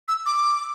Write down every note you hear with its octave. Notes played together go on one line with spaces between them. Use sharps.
E6
D6